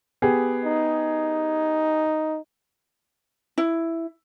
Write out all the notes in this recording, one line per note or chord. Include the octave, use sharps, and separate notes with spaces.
B3 G4 G#4
D#4
E4